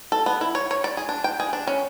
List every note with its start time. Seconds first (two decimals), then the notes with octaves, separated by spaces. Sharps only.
0.12 A4
0.26 B3
0.41 E4
0.55 C#5
0.71 C#5
0.84 D5
0.97 G#4
1.09 D4
1.24 G5
1.40 G#4
1.53 D4
1.67 C#4